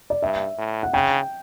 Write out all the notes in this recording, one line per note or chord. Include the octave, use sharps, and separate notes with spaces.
D5
G2 E5
A2
F#5
C#3 G5